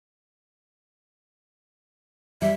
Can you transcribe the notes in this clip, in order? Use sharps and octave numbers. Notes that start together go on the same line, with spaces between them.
G3 E5